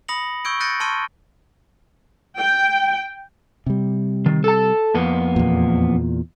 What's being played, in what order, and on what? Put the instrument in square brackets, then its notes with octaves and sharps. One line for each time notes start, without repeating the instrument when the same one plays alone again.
[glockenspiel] B5 D#6 A#6 C#7 F#7
C#6 E6 G6 G#6 D7
F#6 G6 A6 A#6 C#7 D#7
A5 C6 C#6 F6 G#6 D#7
[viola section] G5
[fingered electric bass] C3 G3
[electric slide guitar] D#3
A4 A5
F2 A#3 B3
[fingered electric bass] E2 A#2